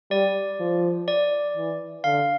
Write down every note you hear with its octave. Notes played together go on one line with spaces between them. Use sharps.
G3 D5
F3
D5
E3
D3 F5